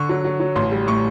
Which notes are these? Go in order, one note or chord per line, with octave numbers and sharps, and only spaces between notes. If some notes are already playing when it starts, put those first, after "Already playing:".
Already playing: D3 C#6
F#3
F#3
F#3
A1 C6
G3
A2 C#6